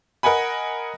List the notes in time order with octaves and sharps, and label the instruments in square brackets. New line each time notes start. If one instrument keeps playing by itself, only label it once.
[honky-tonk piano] A#4 D#5 F#5 G#5 B5